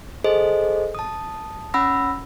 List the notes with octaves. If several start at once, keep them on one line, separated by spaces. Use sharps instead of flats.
G#4 A4 C5 D#5
A5 D#6
C#4 F#5 B5 E6 A#6